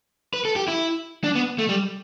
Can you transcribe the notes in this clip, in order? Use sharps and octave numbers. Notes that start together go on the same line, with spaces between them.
B4
A4
G4
E4
D4
B3
A3
G3